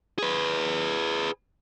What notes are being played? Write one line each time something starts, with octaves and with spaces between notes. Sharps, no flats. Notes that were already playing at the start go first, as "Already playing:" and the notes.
G#4 B4